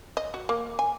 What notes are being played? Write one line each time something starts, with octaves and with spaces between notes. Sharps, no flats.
D#5
F#4
A#3
G#5